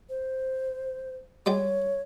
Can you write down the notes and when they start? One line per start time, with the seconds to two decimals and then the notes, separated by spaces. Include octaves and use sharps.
0.09 C5
1.46 G3 G#3 C#5 G5